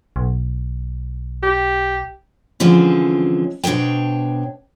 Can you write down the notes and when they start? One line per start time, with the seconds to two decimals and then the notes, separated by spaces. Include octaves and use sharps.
0.16 B1
1.43 G4
2.60 D3 E3 F3 G#3 C4 C#4
3.64 B2 D4 C5 C#5 G5